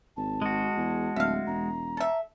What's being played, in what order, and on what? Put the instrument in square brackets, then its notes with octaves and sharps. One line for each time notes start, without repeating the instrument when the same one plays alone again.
[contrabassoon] G#1 [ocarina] A5
[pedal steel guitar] G#3 F#4
[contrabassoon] E2
[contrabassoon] D1 [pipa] E5 F5
[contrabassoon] E1 [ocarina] A#5
[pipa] A4 E5